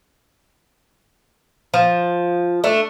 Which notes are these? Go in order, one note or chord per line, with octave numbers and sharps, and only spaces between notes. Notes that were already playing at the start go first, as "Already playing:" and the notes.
F3
A3 D4